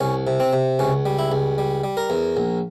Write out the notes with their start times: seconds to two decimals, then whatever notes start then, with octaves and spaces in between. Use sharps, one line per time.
0.01 C2 C#4
0.27 C3
0.40 C4
0.53 C3
0.79 C#2 C#4
1.06 G3
1.19 E4
1.32 C#2
1.58 G3
1.84 G3
1.97 A#4
2.10 E2
2.37 A#1